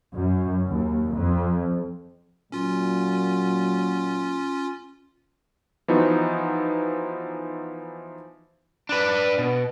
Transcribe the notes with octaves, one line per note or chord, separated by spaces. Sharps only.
F#2
D#2
F2
A#2 F#3 C#4 F4
E3 F3 B3 D#4 F#4
D4 B4
B2